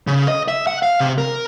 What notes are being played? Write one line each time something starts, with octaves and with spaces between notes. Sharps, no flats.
C#3
D#5
E5
F#5
F5
C3
A#4